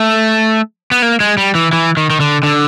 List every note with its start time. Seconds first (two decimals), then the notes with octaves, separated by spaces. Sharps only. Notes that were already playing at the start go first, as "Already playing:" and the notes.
Already playing: A3
0.91 B3
1.02 A#3
1.20 G#3
1.38 G3
1.55 E3
1.73 E3
1.97 D#3
2.10 D#3
2.20 D3
2.43 D3